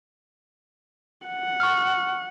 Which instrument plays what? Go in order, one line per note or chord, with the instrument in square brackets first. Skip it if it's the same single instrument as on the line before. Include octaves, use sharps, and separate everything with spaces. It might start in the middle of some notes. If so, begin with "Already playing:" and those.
[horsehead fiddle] F#5
[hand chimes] C#6 F6